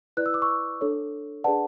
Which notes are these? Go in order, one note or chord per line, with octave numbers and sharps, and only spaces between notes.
E4 B4 D5 F#6
E6
D6
C#6 E6
D4 A4 C#5
D4 G#4 B4 D5 F#5 A5